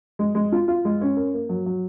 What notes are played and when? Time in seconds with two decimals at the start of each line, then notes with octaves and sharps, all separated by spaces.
0.19 G#3
0.35 G#3
0.52 F4
0.68 F4
0.85 G#3
1.01 C#4
1.17 A#4
1.34 A#3
1.49 F#3
1.66 F#3